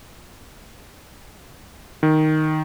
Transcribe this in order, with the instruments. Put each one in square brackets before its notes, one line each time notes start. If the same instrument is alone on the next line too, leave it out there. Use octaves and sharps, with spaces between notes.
[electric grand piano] D#3